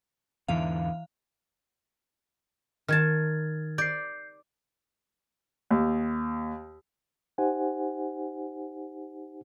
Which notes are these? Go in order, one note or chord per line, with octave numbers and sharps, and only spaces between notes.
E2 G#2 D3 E3 F5
D#3 A5 F6 G#6 A6
D5 G6 C7
D#2
D#4 G4 C5 F#5 G#5